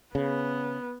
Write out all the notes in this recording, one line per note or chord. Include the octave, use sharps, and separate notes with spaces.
C#3 B3